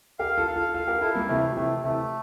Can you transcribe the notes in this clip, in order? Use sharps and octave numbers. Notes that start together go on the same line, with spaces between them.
G4 A#4 F5
F4 A4
F5
F4 A4
F4 A4 F5
G4 A#4
E4 F4 A4
G3 A#3
C3 E3 A3
F3
C3 E3 A3
C3 E3 A3